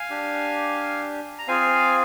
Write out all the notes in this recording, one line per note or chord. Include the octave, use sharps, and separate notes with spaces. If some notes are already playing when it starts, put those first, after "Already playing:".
Already playing: F5 G#5
D4 G4
A#5
C4 F4 G#4 F5 G#5